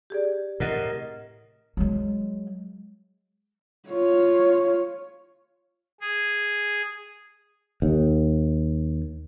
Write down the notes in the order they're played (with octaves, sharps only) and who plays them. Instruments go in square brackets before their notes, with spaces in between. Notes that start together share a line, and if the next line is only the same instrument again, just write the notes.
[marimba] G4 G#4 D5
[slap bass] A2 C3 [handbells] A#4 D#5 [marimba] F#5 F#6 A6
[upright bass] F#3 G#3
[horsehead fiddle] F4 C#5
[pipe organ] G#4
[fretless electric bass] D#2